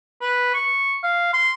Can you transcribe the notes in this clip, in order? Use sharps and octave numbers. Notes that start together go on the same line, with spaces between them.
B4
C#6
F5
C6